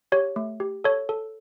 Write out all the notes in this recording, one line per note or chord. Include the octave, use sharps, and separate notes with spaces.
G4 C#5
A3
G4
A4 C#5
A4